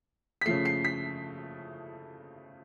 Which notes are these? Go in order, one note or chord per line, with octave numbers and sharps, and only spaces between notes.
B6
C#3 F3 A3 C7
C7
B6